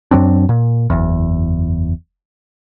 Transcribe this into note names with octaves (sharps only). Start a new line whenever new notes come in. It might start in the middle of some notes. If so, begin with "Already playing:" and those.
F#2 F#3 C4 D4
A#2
F#1 E2